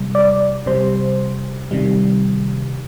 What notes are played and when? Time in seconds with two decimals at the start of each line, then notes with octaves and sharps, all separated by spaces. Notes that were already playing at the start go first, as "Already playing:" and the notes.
Already playing: C3 G3
0.15 D5
0.66 C3 G3 C5
1.71 C3 D#3 G3